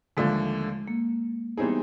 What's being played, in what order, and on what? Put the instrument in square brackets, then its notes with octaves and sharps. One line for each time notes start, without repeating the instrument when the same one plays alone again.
[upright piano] D#2 D3 F3 A3 D4 [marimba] G#3
[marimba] A#3
[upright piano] E3 G3 C4 D#4 G#4 [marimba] B3